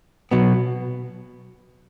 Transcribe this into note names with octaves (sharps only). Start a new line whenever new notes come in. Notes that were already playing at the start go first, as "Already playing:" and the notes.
B2 F#3 B3